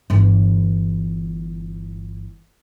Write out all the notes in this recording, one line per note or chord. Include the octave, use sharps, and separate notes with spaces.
G1 E3